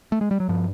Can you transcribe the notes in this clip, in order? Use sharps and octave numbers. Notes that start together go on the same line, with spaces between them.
A3
G#3
G3
F#3
G2 F3